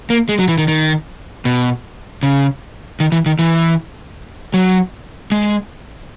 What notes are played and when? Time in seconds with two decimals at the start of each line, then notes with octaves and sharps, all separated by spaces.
0.10 A#3
0.29 G#3
0.39 F#3
0.48 E3
0.58 D#3
0.68 D#3
1.45 B2
2.23 C#3
3.00 D#3
3.12 E3
3.26 D#3
3.39 E3
4.54 F#3
5.32 G#3